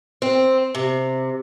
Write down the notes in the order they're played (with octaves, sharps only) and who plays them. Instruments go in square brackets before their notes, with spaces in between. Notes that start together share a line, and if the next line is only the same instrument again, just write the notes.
[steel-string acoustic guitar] C4
C3